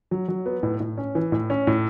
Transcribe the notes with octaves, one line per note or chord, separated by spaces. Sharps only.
F#3
F#3
B3
A2
A2
C#4
E3
A2
C#4
A2